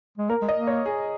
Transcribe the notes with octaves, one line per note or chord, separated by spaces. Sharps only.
G#3
A#3 A#4
G#3
D#5
A#3
C#5
G#4